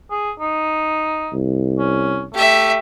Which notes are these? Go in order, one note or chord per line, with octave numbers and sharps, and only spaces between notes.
G#4
D#4
C2
C#4
A3 G4 E5